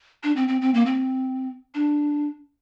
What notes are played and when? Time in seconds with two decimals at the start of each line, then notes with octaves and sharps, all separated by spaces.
0.23 D4
0.36 C4
0.48 C4
0.62 C4
0.74 A#3
0.86 C4
1.75 D4